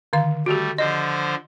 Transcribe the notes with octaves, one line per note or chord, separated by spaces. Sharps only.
D3 D#3 F5
G3 A3 F#4 G4
D3 F3 C5 D#5